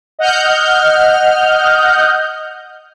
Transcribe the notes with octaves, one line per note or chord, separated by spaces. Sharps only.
D#5 F#5 F6 G6